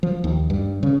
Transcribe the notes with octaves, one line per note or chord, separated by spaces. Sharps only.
F3
D#2
G2
C#3